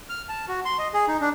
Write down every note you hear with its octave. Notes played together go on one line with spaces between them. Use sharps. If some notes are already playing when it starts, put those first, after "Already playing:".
F6
A5
F#4
C6
D#5
G#4
D#4
D4